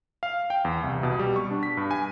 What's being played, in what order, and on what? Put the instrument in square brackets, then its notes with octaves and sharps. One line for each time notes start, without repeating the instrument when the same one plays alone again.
[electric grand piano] F5
G5
E2
C2
B2
G3
C#6
D4
B6
G2
G#5